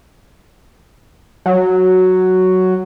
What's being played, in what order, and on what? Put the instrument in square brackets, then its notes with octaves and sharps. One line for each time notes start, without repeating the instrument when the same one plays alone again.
[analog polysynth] F#3